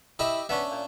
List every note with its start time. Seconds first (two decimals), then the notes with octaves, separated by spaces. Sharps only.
0.19 E4 G4 D#5 E5
0.49 B3 C#4 D4 E5
0.71 A#2